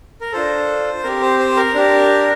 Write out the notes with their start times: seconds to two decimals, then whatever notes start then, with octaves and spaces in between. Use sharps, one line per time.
0.21 A#4
0.32 D4 F4 A4 C5
1.03 C4 G4 A#4
1.22 C5
1.39 C5
1.57 A#4
1.74 D4 G4